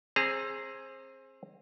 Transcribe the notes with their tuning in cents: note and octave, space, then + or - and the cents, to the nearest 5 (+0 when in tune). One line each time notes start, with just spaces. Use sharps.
C4 +25 G#4 +0 A#5 -30